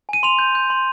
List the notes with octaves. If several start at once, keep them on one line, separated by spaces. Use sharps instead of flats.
G#5 D#7
C6 F7
G6
G6
C6